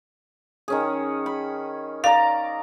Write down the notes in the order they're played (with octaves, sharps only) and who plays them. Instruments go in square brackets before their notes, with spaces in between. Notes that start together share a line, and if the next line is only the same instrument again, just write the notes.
[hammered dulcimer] D#3 C#4 G#4
B5
[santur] D5 A#5 [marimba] F5